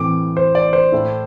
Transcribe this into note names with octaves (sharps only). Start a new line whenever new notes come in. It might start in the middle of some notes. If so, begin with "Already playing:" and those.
Already playing: A2 E3 C4 D6
C5
D5
C5
A2 A3 E4